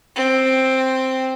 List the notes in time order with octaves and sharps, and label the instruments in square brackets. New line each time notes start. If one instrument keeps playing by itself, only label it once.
[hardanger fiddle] C4